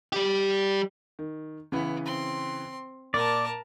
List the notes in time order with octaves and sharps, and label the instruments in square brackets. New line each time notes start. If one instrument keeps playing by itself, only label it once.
[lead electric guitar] G3 G4
[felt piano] D#3
[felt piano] C#3 E3 [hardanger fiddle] B3
[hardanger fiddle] C4 C6
[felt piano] A#2 [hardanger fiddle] A#4 A5 [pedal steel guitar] D5